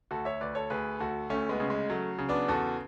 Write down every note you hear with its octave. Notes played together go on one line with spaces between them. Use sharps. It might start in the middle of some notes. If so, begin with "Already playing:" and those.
D2 F#4 A4
C#5 E5
D2 B4 D5
A4 C#5
D2 G#4 B4
D2 F#4 A4
D2 A3 C#4
G#3 B3
C#3
G#3
F#3 A3
C#3
B3 D4
E2 F#4 A4